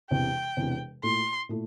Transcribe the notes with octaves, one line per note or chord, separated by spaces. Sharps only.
E1 E2 C3 G5
E1 E2 C3
A#2 A3 E4 A4 C6
A#2 A3 E4 A4